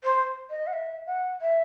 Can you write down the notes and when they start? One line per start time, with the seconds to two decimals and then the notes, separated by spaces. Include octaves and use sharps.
0.04 C5
0.50 D#5
0.67 F#5
0.73 E5
1.07 F#5
1.41 E5